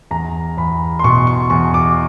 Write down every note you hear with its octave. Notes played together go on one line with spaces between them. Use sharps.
E2 A#5
E2 B5
C6
B2 C#6
C#6
E2 C#6
D6